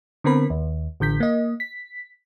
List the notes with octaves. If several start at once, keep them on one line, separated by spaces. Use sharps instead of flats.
D3 B3 C4 A#4 B5
D#2
A1 D3 G6 B6
A#3 D#5
B6